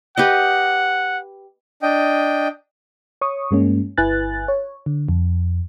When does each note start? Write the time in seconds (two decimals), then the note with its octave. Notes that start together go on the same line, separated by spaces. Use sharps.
0.17 G4 B4 D#5 F#5
1.83 D4 D#5 G5
3.21 C#5 C#6 D#6
3.51 G2 G#3 A#3 C#4
3.97 G1 E4 B4 G#5 F#6 A6
4.48 C#5
4.86 D3
5.09 F2